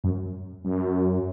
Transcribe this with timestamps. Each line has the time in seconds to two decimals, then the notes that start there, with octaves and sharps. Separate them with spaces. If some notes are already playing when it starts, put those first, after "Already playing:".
0.04 F#2
0.65 F#2